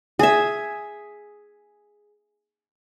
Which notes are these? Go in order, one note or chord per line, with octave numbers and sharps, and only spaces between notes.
G#4 E5